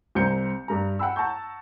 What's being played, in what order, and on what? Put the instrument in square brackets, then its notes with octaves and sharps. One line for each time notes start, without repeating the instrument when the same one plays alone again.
[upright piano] C2 C4 C5 A#5 G6 C#7
G2 A#5
F#5 G5 B5 E6
F#5 A5 A#5 C#6 G6